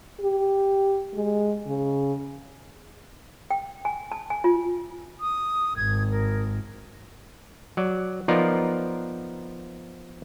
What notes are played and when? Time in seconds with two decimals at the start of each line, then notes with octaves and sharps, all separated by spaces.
0.21 G4
1.15 G#3
1.67 C#3
3.51 G5
3.85 G#5
4.12 A5
4.30 G#5
4.44 F4
5.20 D#6
5.77 G#1 G#6
6.11 A#4
7.77 F#3 D5
8.28 F3 B3 D#4 F4 A#4 D5